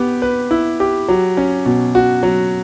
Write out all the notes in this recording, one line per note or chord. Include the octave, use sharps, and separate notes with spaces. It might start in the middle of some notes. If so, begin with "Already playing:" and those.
Already playing: B3 G4
B4
E4
G4
F#3
C#4
B2
F#4
F#3